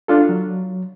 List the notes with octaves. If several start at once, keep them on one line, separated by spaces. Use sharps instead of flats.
D4 F4 A4
F#3